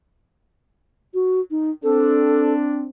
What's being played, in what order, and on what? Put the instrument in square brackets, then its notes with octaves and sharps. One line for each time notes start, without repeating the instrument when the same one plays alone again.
[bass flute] F#4
D#4
[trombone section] C4 D4 [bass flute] A4